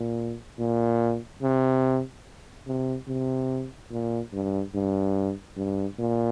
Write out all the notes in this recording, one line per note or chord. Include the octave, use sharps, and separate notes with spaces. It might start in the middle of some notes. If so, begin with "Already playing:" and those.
Already playing: A#2
A#2
C3
C3
C3
A#2
G2
G2
G2
A#2